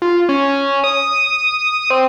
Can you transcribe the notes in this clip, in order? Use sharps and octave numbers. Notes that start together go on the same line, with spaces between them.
F4
C#4
D#6
C4